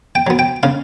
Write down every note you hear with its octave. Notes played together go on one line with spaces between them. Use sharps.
G5
F#3 B3
G5
C#3 F5